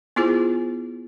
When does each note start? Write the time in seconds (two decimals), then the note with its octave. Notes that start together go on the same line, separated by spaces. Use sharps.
0.16 B3 E4 F4 G#4 C5